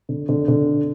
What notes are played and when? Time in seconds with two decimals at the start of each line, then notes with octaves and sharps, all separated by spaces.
0.09 D3
0.29 D3
0.48 D3